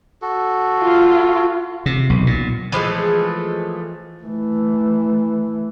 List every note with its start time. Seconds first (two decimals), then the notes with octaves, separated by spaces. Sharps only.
0.22 F#4 A4
0.82 F4
1.86 C3
2.10 B1
2.27 A#2
2.72 E3 F3 G#3 A3
4.23 E3 A3